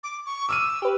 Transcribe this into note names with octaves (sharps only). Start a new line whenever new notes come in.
D6
C#6
D6 E6 F6 D#7
G4 B4